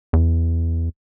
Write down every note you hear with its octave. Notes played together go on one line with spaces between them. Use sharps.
E2